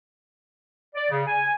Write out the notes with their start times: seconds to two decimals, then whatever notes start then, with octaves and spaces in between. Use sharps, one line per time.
0.94 D5
1.10 C#3
1.26 G#5